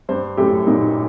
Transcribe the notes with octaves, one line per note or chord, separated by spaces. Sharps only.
G2 C5
F#2 A2 G4
G2 A#2 D#4